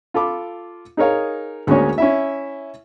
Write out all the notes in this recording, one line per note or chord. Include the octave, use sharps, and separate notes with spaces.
F4 A4 B5 D6
D#4 G#4 A#4 C#5 F5
D2 G#3 A#3 C#4 C#5
C#4 E4 E5